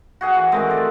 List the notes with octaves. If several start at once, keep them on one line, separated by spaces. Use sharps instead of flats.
F#4 G#4 F#5
E3
D#3 G#3 A3 C4
D5